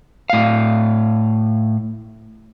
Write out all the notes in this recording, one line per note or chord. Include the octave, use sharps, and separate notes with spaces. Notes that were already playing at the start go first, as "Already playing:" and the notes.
A2 F5